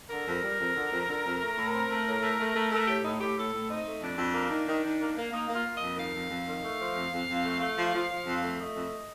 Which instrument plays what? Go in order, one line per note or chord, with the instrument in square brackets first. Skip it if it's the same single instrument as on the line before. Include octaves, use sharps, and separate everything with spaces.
[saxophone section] D3 A#4
F2
G3
F2
D3
F2
D3
F2
A3
A2
C4
A3
A2
A3
A3
A3
A3 A4
A2 G4
A2 D#4
A2 G4
A2 A4
A2
C4 D#4
A3
F2 D4
F2
A#3
D#3
D#3
D#3
A#3
A#3
A#3 D#4
A#3
F4
A#3
F2 D#5
D#3 F5
F2
F2
D#3
A3
F3
F2
F2
F2
A3
A3
F3
F3
F3
F2
A3
A3 D#5
F2